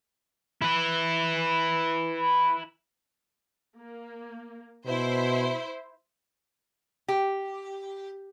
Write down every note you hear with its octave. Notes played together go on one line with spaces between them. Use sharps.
E4 B4
A#3
B2 E4 C5
G4